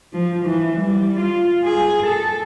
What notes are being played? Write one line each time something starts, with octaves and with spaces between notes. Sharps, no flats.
F3
E3
G3
F4
G#4
A4